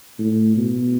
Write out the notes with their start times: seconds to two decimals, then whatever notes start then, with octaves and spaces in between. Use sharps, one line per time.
0.19 A2
0.57 B2